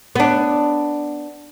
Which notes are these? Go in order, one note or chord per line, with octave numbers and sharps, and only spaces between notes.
B3 D4